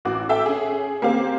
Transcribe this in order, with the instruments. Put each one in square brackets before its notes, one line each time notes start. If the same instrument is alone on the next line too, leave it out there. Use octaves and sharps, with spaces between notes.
[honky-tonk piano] A1 F#4 D6
A4 E5 G5
C#4 G#4
A#3 C4 G4 F5